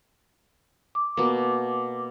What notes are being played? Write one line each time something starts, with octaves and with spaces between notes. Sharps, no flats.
D6
B2 A#3